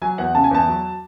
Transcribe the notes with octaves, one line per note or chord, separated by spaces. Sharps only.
F#3 G#5
E2 F#5
C#3 A5
G#5
E2 A5
F#3